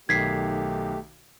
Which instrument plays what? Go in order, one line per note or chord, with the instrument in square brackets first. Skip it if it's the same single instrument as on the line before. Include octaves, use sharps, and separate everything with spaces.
[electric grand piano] B1 D#3 [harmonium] A3 G4 [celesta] G#6 B6 C7